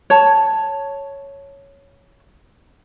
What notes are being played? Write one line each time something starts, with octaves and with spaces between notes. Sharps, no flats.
C#5 A5